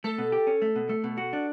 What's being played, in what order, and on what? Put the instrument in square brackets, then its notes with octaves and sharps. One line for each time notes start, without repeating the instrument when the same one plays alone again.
[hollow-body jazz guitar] A3 [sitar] A4
[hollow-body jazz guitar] B2
G4
C#4
A3
B2
A3
B2
F#4
D4